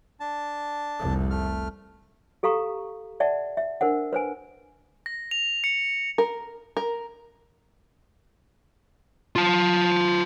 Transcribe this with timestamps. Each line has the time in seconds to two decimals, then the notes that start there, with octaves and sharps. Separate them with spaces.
0.20 D4 A5
1.00 F1 C2
1.30 A3 F6
2.43 G4 A4 F5 A#5 C#6
3.20 D5 E5 F#5 A5
3.57 E5
3.81 D4 A#4 C5 F#5
4.13 B4 C5 G#5
5.06 A#6
5.31 F7
5.64 C#7
6.18 A#4
6.77 A#4
9.36 F4 A5